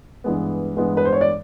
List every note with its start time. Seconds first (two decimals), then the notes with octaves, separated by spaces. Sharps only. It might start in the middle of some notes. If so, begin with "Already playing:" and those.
0.24 G2 E3 G#3 B3
0.77 G2 E3 G#3 B3
0.97 B4
1.05 C5
1.13 C#5
1.21 D5